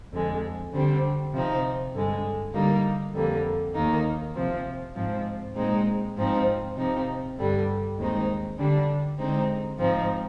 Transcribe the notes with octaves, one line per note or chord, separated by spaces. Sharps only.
F2 D3 G#3
D3 G3 C4
C3 F3 C4 D#4
G2 D3 G#3
D3 G3 A#3 D#4
F2 D3 G3 A#3
D#2 D#3 A#3 D#4
C3 F3 C4
G#2 F3 C4
A#2 G#3 C4 D#4
G#2 F3 C4 D#4
C3 F3 C4 D#4
G2 D3 G3 D4
D#2 D#3 G#3 C4 D#4
D3 G3 D4
D3 G#3 C4 D#4
G#2 F3 C4 D#4